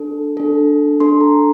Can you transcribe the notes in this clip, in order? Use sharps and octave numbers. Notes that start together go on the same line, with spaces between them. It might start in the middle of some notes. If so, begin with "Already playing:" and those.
Already playing: D4 A4
D4 A4
D4 A4 C6
A#5